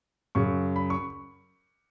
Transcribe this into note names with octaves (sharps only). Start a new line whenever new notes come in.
F#2 C#3 F#3 C#6
B5
C#6